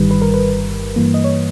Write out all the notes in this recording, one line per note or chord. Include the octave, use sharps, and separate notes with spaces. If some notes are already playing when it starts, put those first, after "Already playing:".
Already playing: G1 G2 D#3 G3 B4
B4
A#4
B4
G2 E3 A#3
D#5
C#5